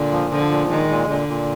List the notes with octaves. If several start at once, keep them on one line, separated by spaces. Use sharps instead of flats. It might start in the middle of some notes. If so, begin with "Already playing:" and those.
Already playing: A#2 D3
F3
D3 F3
A#2
D#3 G#3
A#2
A#2 D3
A#2